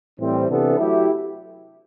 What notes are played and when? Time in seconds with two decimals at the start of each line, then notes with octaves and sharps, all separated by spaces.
0.19 A2 E3 G3 C4
0.49 C3 E3 B3 D4 A4
0.79 F#3 A3 E4 G4